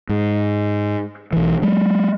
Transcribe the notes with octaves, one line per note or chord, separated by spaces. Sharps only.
G#2
B1 E3
F#3 G#3